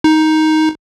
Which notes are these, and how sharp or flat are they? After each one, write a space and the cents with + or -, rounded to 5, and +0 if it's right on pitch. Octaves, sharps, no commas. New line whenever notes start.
D#4 +10